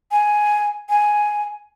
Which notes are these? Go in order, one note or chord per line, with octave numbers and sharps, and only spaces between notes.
G#5
G#5